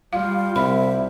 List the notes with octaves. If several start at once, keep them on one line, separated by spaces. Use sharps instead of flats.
G3 F4 F5
C2 E5 B5